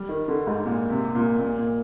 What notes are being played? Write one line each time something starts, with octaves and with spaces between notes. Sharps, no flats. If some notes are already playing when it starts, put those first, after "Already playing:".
Already playing: G3
D#3
D3
G#2
A#2
C3
A#2
A#2
A#2